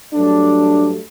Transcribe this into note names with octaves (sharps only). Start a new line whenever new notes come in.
G2 F#3 A3 D4